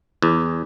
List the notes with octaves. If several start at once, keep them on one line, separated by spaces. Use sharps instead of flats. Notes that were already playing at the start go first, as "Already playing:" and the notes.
E2